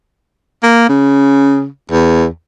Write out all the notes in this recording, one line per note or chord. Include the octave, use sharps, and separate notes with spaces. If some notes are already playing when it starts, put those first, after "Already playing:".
A#3
C#3
E2